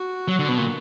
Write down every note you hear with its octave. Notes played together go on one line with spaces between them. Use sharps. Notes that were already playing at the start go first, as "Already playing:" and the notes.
Already playing: F#4
F#3
D3
B2
A#2